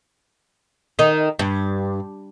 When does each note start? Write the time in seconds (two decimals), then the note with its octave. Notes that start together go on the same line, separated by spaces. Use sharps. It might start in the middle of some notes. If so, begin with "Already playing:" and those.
0.99 D#3 D#4
1.39 G2